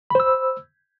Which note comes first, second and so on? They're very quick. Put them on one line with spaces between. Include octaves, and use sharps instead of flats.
B5 C5 E6